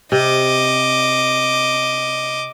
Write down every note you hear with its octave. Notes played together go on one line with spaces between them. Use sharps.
C3 D#5 D6